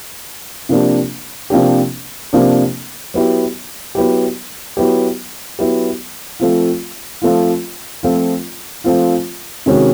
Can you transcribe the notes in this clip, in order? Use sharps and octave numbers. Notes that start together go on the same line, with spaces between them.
C3 F3 A#3 D4 G4
C3 F3 A#3 D4 G4
C3 F3 A#3 D4 G4
F#3 B3 E4 G4
F#3 B3 E4 G4
F#3 B3 E4 G4
F#3 B3 E4 G4
F3 A3 C4 F4
F3 A3 C4 F4
F3 A3 C4 F4
F3 A3 C4 F4
C3 D#3 G#3 C#4 F#4